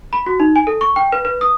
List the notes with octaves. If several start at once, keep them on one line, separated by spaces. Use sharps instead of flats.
B5
F#4
D#4
G#5
A4
C#6
G5
B4
B4
D#6